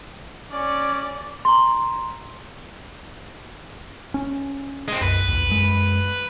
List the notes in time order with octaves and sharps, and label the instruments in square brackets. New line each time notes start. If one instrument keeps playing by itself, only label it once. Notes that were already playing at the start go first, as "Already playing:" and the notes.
[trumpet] C#4 [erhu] D5
[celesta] A#5 C6
[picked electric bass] C#4
[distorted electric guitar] G#3 C4
[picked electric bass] C2 F#2 [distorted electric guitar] B4
[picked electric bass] A#1 E2
F#2 G#3